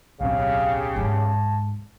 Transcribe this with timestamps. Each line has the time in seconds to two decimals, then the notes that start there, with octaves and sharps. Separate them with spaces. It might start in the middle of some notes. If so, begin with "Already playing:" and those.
0.21 D1 B1 C#3 C4 G4 F5
0.96 G#2 G#3 A5